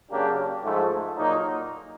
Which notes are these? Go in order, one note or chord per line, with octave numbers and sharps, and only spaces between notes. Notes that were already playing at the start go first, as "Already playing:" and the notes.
C#3 F#3 A#3 D4 G4
G#2 F3 A3
A#2 F#3 A#3 D#4